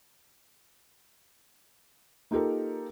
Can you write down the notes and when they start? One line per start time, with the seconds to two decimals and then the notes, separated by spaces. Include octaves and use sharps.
2.31 A#3 D#4 F4 G4 A4 A#4